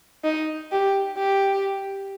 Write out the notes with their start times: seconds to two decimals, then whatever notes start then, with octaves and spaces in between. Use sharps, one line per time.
0.24 D#4
0.72 G4
1.18 G4